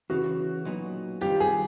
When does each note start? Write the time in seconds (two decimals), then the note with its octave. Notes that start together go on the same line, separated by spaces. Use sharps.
0.10 E2 C#3 E3 F#4
0.65 B1 A#2 F#3 B3 D#4
1.21 D#3 G3 C4 F4 G4
1.40 G#4